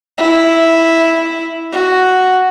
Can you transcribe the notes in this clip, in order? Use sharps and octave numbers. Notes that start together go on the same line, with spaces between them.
E4
F#4